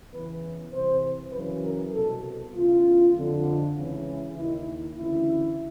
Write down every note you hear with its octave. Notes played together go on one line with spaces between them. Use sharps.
E2 C#3 E3 B4
C2 C3 E3 C5
F#2 C#3 E3 B4
A#4
C2 B2 A4
E2 C#3 E3 F4
F2 D3
C#2 C#3 E3
D#2 D#3 E4
D2 C#3 E3 E4